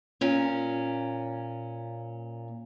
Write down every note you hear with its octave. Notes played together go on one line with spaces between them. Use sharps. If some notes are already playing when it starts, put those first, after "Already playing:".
A#2 C#4